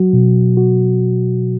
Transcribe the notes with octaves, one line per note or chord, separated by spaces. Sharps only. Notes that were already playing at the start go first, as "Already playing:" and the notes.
Already playing: F#3 F#4
B2
F#4